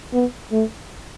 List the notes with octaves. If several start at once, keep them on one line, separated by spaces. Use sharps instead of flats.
B3
A3